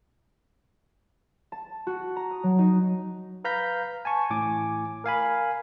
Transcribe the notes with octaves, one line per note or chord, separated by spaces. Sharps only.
A5
F#4
A#5
D#6
F#3
D#4
B4 F5 A#5 G6 B6
G#5 A5 C#6
A1 A2 G#5 D6
A#4 F5 G#5 B5